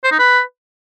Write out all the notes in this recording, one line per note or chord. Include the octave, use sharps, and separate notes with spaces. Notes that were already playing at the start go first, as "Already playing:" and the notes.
C5
D#4
B4